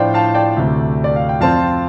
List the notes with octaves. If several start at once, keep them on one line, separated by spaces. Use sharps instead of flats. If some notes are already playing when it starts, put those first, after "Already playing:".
Already playing: A2 F3 D4 F4 C5 D5 F5 G5
F5 A5
D5 G5
D2 C3 A3
D5
F5
G5
F2 F3 C4 F4 F5 A5